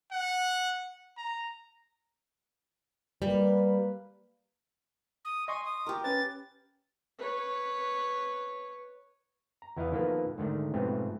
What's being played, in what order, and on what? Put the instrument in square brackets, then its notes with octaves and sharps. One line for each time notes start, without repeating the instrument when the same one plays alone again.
[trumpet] F#5
A#5
[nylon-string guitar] G3 [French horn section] A#3 B4
[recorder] D#6
[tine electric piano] D#5 C6 C#6 [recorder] G#5
[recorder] D#6
[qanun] G4 A#4
[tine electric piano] C#4 B4 [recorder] A6
[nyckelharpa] B4 C#5
[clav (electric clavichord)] A#5
E2 E3 E4 D#5 F5
D#3 F3 A#3 B3 A4 B4
G#2 D3 D#3 A3
G#2 B2 F3 A3 B3 C4